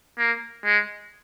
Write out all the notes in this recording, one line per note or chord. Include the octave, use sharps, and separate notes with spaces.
A#3
G#3